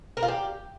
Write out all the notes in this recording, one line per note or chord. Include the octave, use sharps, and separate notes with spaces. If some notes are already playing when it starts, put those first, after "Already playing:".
A#4
F4
G4